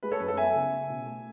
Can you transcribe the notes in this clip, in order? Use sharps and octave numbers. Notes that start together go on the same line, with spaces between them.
G#3 B4
A4 C#5
F#2 B4
A4
B3 E5 G#5
C#3
C#4
B2
A3